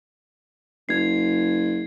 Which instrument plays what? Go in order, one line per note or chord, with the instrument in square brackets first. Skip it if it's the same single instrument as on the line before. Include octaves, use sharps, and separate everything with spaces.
[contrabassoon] F#1 [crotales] G#6 C7